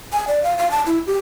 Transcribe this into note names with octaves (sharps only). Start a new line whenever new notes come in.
G#5
D5
F5
F5
A5
E4
G4